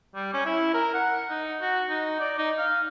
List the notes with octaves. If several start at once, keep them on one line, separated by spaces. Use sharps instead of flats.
G3
C#4
E4
A#4
F#5
D#4
F#4
D#4
D5
D#4
F5